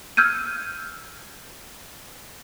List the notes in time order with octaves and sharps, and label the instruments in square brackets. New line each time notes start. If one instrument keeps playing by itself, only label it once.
[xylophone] E6 F6 G6 G#6 D#7